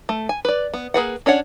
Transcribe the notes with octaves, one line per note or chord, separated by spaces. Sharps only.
A3
G#5
B4 D5
B3
A#3 G#4 B4 F#5
C#4 D4 C#5 F#5